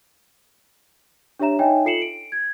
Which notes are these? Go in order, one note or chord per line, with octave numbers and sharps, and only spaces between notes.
D4 G4 C#5 E5 A#5 E7
D#4 C#5 D#5 E5 G5 G#5
F4 A4 C7 C#7 E7 F#7
D7
G#6